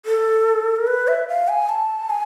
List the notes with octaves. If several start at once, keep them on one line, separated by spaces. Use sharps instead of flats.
A4
A#4
B4
E5
F5
G#5
A5
G#5